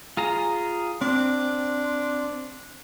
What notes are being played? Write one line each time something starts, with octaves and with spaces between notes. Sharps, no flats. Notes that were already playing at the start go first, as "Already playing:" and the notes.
F4 G#4 A#5
C4 D4